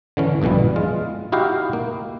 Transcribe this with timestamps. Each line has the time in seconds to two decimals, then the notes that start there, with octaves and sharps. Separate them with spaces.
0.17 D3 E3 C#4
0.42 A#1 G2 B2 E3 G3
0.76 G#3 F4
1.32 D#4 E4 F#4 G4 F5
1.73 A#3